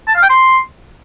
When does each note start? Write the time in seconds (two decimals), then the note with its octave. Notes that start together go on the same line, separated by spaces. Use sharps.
0.08 A5
0.15 F5
0.22 G5
0.30 C6